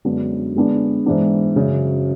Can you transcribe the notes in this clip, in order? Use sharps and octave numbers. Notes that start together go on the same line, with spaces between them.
F#2 D3 G#3 B3 D4
D3 G#3 B3 D4
G#2 E3 B3 D4
F#2 C#3 F#3